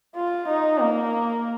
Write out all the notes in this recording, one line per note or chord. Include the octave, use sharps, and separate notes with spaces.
F4
D#4
A#3